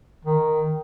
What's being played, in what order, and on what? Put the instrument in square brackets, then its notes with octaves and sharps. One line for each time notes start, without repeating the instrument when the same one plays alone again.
[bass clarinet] D#3